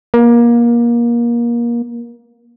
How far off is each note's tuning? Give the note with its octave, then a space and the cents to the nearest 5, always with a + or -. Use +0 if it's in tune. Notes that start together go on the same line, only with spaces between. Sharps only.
A#3 +25